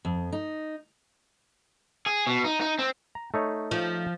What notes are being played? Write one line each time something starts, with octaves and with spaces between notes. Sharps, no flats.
F2
D#4
G#4
B2
D#4
D#4
C4
A#5
A3 D#4 C#5
F3